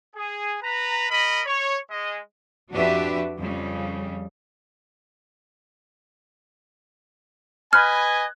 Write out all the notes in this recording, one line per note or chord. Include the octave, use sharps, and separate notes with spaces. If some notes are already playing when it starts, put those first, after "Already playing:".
G#4
B4 A#5
A#4 D#5 B5
C#5
G#3 D#5
F2 D4 F#4 G4 B4 E5
F2 C#3 G3
B4 D#5 G#5 B5 F6 F#6 G#6